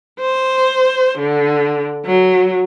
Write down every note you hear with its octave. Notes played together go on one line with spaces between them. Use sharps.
C5
D3
F#3